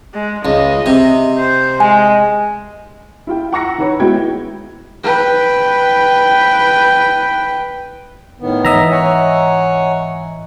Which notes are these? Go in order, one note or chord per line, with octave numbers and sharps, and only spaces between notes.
G#3
C#2 D#5
C3
C5
G#3 G#5
E4 F4 G5
F#5 A#5 C#6 E6 A#6 C#7
D#3 B4 C#5
G#3 B3 E4 F#4 G5 G#6
B4 G5
A2 D#3 B3
G#2 E3 D#5 E5 A#5
C#5 F#5 G#5